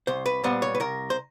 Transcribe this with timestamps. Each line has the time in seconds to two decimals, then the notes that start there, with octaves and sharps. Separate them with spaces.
0.07 C2 C5
0.26 B4
0.44 A#2 G3 B3 C5
0.62 C#5
0.75 B4
0.80 C2 A#4
1.10 C5